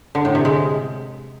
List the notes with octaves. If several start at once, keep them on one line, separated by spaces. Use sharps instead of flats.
D3
A2
C3
G#3